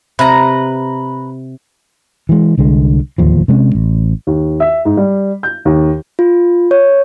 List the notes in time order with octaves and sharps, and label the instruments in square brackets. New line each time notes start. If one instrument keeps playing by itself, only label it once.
[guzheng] C3 [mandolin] B4 A#5
[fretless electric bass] E3 G#3
C2 D3 G#3
D1 D#2 F3
C3 G#3 B3 C#4
A1
[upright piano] D#2
E5
G#2
G3
G6
D#2
[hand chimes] F4
C#5